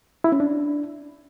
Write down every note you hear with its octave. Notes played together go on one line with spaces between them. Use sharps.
E4
C#4
D4